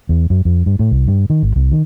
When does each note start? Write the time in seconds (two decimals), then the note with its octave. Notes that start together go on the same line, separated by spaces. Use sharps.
0.09 E2
0.30 F#2
0.45 F2
0.66 G2
0.79 A2
0.91 C2
1.08 G2
1.30 D#3
1.43 G#1
1.56 C2
1.72 D#3